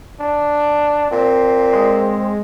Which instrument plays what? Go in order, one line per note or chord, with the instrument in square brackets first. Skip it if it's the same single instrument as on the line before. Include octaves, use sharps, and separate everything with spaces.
[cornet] D4
[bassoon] A#2 [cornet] C4
[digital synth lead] G#3